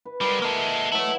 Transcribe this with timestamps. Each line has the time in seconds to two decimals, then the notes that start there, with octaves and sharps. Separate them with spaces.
0.06 B4
0.21 C2 G3 G#3 A#4 F#5 A#5
0.42 A#3 A4 D#5 E5 A#5
0.92 E3 F#3 E4 A4 C#5 E5